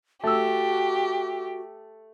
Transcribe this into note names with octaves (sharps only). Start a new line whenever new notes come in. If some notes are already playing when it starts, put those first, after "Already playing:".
A3 F#4 G4 E6